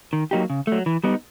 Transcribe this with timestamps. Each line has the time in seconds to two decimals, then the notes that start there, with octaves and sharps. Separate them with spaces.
0.13 D#3
0.31 F#3 A#3 D#4 G4
0.50 C#3
0.67 F#3 A3
0.86 E3
1.04 G3 B3 D#4